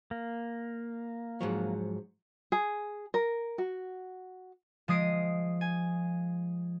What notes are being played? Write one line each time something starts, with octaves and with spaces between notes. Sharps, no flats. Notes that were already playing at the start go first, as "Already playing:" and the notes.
A#3
G#2 F3 F#3
G#4
A#4
F#4
F3 G#3 D#6 C7 D7
G#5